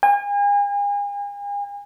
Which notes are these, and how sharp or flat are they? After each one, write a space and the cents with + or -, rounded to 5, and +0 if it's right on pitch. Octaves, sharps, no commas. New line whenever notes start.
G#5 -40